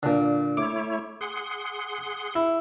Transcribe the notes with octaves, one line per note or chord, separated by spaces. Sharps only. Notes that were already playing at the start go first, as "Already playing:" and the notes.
A#2 D3
A3 E4 C#5 D6
G#4 F#5 C6
E4